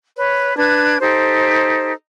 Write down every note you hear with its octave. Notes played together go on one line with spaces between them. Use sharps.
B4 C#5
D4 B4 G#6
D#4 G4 A4 C5